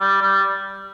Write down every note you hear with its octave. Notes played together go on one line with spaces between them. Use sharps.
G3
G3